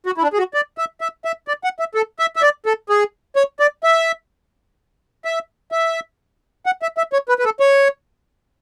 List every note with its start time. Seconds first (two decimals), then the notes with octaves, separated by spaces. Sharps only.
0.06 F#4
0.18 E4
0.23 D4
0.33 G#4
0.38 F#4
0.54 D5
0.78 E5
1.01 E5
1.25 E5
1.48 D5
1.64 F#5
1.79 E5
1.95 A4
2.19 E5
2.36 E5
2.42 D5
2.66 A4
2.89 G#4
3.36 C#5
3.60 D5
3.84 E5
5.25 E5
5.72 E5
6.66 F#5
6.82 E5
6.98 E5
7.13 C#5
7.29 B4
7.39 B4
7.45 A4
7.60 C#5